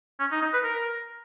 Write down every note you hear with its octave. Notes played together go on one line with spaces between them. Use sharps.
C#4
D#4
D#4
B4
A#4